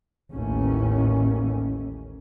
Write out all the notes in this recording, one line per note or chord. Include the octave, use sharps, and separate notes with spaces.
A1 D#2 A2 C#4